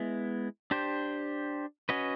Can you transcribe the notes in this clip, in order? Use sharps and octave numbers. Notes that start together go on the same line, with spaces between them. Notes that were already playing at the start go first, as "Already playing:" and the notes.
Already playing: G#3 B3 E4
D4 G4 C5
C#4 F#4 B4 D#5